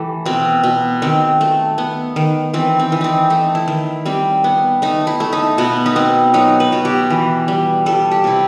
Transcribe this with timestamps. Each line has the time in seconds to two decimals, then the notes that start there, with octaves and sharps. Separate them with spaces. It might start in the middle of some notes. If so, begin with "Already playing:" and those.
Already playing: E3 A3 G4 A4
0.26 B2 C4
0.64 B2
1.02 D#3 C4
1.41 A3
1.78 B3
2.16 D#3
2.54 E3 C4
2.80 C4
2.92 E3
3.01 C4 D#4
3.30 A3 D#4
3.55 E4
3.68 D#3
4.06 G3 C4
4.44 B3
4.82 A3 D#4
5.07 E4
5.20 A3
5.33 D#4
5.58 B2 B3
5.86 D#4
5.96 B3 C4
6.34 F#3 D#4
6.60 B4
6.72 B2
6.85 G4
7.10 E3
7.48 G3
7.86 G3 A4
8.11 G4
8.24 C3 E4